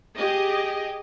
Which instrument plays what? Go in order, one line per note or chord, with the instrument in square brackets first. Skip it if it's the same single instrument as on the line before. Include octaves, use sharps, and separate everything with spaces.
[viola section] G4 G#4 D#5